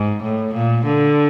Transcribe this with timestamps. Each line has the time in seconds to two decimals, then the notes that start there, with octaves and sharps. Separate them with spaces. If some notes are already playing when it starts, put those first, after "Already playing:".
Already playing: G#2
0.23 A2
0.54 A#2
0.86 D3